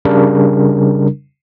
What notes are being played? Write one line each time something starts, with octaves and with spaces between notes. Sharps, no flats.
C#3 G3 D4 A#4